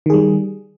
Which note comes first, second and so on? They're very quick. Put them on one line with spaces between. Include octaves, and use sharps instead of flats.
D#3 G#4 G3